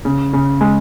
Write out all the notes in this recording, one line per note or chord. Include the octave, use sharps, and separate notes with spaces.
C#3
C#3
G#3